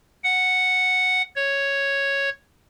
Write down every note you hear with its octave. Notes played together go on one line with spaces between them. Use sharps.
F#5
C#5